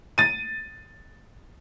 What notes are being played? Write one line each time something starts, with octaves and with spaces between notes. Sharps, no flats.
A6 D#7